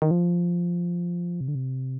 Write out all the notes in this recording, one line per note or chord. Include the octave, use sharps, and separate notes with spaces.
D#3
F3
C3
D3
C3